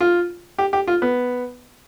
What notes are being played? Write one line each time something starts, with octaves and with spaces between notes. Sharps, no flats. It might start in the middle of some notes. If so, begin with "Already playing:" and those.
F4
G4
G4
F4
B3